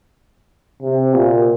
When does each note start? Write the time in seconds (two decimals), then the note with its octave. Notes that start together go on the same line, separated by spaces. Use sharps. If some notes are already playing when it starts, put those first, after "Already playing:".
0.83 C3
1.14 A#2